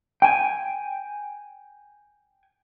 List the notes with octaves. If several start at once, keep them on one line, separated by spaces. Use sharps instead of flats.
G5 G#5